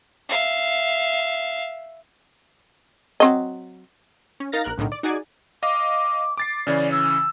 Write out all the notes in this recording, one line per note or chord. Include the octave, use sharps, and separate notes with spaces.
E5 F5
F#3 C4 D#5
C#4
D#4 A#4 F5 A6 A#6
A#1 A#4 F#6
B1 A2 D3 D#3
D5
D#4 F#4 G#4 D5 G#5
D#5 F5 D6
D6 A6 C7
C#3 E3 C#4 D5
E6